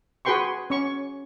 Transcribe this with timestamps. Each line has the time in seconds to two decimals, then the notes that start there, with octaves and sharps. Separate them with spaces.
0.25 F#4 G#4 B4 G5 C6 C#6
0.70 C#4 C#6